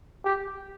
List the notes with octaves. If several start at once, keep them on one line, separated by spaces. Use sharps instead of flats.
G4